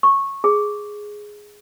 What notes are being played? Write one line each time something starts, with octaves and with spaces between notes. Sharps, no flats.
C#6
G#4